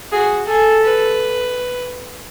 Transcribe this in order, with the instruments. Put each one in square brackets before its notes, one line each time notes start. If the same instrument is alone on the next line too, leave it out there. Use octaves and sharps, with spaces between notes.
[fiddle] F#4 [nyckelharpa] G#4
[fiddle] G#4 [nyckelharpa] A4
[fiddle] B4